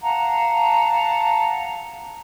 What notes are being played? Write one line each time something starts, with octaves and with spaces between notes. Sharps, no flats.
F5 F#5 A5 A#5